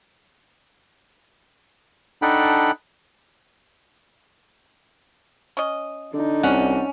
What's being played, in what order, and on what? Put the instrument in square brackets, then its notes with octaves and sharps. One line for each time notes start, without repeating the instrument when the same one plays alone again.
[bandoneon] D4 D#4 A4 F#5 G5 B5
[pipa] C#4 D#5
[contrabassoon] D3 [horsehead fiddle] D4 D#4
[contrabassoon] C2 [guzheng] C#4 [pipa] F#5